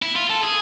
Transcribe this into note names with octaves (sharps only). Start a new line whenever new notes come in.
E4
F4
A4
G#4